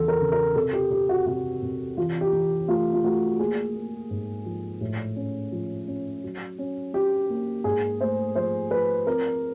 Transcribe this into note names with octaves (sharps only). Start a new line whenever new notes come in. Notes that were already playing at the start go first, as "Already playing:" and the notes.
Already playing: E2 C#3 F3 A4
A#4
C#3
A#4
C3 A4
G4
C3 G4
F#4
C3 F#4
C3
E3 F4
G4
E3
A3 F4
F4
A3 F#4
A#3 G#4
A#3
G#2
F3
A2
C#4
F3
C#4
F#3
C#4
C#4 G4
A#3
G#2 G#4
A3 C5
F3 C5
F3 B4
C4 A#4